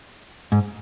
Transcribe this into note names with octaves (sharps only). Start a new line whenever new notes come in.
G#2